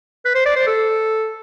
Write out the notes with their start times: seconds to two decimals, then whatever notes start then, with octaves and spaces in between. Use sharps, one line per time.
0.25 B4
0.35 C5
0.46 D5
0.56 C5
0.67 A4